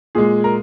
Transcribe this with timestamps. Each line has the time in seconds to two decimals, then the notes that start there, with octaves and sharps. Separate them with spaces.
0.15 A#2 G#3 G#4
0.44 A#4